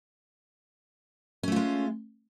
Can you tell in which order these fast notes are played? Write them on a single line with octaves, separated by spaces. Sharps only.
C#4 A3 F4 G#3